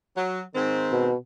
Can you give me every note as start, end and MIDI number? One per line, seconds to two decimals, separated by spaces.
0.16 0.40 54
0.54 1.08 44
0.54 1.08 51
0.54 1.08 60
0.92 1.15 47